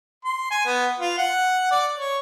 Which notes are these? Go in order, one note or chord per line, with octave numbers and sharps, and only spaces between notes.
C6
G#5
B3
F4
F#5
D5
C#5